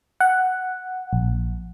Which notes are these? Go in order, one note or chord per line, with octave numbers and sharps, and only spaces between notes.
F#5
A#1